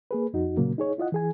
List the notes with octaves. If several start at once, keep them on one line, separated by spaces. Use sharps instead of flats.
A#3 G#4 B4
F2 D#4 F#4
A#2 C#3 F#3 A#3
D#4 G#4 C#5
E4 F4 D#5 F#5
E3 G#4 G#5